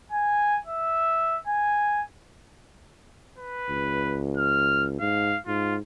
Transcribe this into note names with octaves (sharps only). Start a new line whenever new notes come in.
G#5
E5
G#5
B4
C#2
F6
G#2 F5
G#2 F4